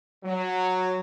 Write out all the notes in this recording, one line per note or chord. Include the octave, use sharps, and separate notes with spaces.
F#3